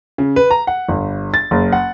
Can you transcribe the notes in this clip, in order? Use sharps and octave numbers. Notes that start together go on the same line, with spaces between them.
C#3
B4
A#5
F#5
G1
A6
F#1
F#5